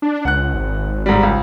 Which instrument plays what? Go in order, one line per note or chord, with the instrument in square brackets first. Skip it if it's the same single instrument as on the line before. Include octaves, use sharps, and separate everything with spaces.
[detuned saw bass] D4
[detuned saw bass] C#2 [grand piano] F#5 F#6
[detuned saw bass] G#1
[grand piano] G#2 G3
C#2